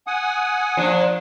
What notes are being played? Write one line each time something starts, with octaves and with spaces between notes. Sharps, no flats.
F#5 G#5 D#6
A#2 F3 D4